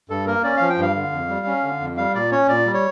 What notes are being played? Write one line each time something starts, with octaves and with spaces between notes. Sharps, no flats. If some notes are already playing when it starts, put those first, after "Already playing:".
G2 A4
A#3 A#4
C#4 D5
F3 F5
G5
G2 F5
D3
F2
G3
C#4
D3
F2
G3 F5
A#2 D5
C#4 C#5
A#2 D5
G3
C#5